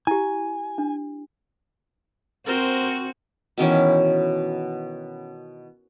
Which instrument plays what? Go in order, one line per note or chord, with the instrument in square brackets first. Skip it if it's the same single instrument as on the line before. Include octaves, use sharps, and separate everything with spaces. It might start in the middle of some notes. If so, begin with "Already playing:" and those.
[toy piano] E4 G4 [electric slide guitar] G#5
[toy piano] D4
[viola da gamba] C4 F#4 [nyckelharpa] A#4 C5
[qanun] B2 D#3 E3 C#4